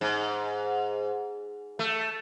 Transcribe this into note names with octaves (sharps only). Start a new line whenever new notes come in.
G#2
A3